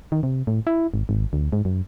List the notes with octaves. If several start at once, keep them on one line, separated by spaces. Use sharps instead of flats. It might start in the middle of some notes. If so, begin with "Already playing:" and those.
D#3
C3
A2
E4
G#1
G#1
D2
G#2
F#2